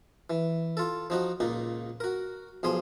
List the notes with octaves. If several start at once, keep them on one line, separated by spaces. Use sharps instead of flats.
E3
F4 A4
F3 D#4 F#4
C#2 A#2 D#4
F#4 A#4
B1 F3 G#4 C6